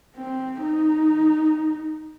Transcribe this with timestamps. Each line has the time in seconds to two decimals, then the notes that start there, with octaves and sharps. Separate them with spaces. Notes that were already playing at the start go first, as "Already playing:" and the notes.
0.16 C4
0.61 D#4